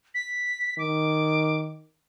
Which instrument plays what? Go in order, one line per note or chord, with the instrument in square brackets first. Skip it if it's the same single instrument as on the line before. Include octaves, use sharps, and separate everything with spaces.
[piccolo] B6
[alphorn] D#3 [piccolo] D6